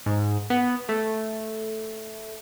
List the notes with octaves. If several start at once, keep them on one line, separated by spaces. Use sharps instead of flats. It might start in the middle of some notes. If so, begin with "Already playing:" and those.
G#2
B3
A3